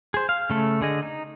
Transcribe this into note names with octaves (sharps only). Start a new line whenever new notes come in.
G#4 C5
F5
C#3 A3 A4
D3 G#4 D#5
D#4